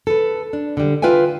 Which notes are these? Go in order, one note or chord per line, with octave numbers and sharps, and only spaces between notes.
A4 B4
D4
D3 G3
F4 B4 E5 G5 G#5